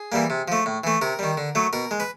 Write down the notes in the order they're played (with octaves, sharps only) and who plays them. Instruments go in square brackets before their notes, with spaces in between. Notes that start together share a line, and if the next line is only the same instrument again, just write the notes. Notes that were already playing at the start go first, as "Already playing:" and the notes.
Already playing: [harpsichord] G#4
E3 G3 A#3
C3
F3 A3
A2
E3 A3
C3 A#4
D#3 G3
D3
F#3 A3
B2 A#4
G#3
B4